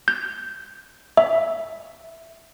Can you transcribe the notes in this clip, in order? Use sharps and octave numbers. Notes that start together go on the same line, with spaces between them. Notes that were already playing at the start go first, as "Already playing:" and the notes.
G6
E5